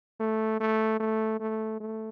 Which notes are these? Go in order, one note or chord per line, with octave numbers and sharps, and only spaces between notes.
A3
A3
A3
A3
A3